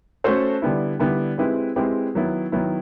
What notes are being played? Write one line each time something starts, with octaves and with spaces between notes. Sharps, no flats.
A3 C#4 F#4 A4 C5
D3 G3 B3 E4
D3 G3 B3 E4
G#3 C4 E4 G4 B4
G#3 C4 E4 G4 B4
D#3 F#3 B3 E4
D#3 F#3 B3 E4